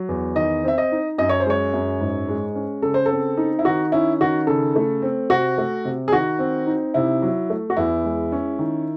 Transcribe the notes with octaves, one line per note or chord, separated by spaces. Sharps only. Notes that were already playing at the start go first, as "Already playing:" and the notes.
Already playing: F#3
E2
D#3 D#5
C4 E5
D#5
D#4
F#2 D#5
C#5
C5
G#3 C#5
F#2
G#2
G#3
C#4
C#3 A4
C5
A4
C4
D#4
E4
D#3 F#4
C#4 E4
D#3 F#4
C#3 A4
A3
C4
C3 F#4
A3
C3
G#4
D#3 F#4
C4
D#4
C3 E4
F#3
A3
F#4
E2 E4
G#3
C#4
D#3